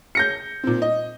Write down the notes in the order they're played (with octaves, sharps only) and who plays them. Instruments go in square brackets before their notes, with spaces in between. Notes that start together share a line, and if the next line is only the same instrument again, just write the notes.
[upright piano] G6 A#6 C#7
[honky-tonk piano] A#2 C4
D#5